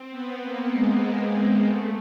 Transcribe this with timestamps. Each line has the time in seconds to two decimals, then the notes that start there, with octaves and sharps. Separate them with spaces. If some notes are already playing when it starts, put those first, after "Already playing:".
Already playing: C4
0.11 B3
0.42 A#3
0.72 G#3
1.64 A3